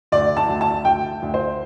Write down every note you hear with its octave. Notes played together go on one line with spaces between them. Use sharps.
D2 D5
A5
D2
A5
D2 G5
D2
C5